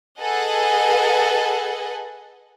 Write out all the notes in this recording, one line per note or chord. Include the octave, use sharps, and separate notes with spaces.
G#4 A4 B4 D#5 F#5 G#5